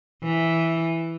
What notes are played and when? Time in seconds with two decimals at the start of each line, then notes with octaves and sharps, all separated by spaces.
0.23 E3